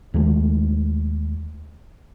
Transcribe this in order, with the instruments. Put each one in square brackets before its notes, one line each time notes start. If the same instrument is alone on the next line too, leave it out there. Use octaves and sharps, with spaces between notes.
[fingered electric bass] D#2 G#3 A3